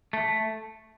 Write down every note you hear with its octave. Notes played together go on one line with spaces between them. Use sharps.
A3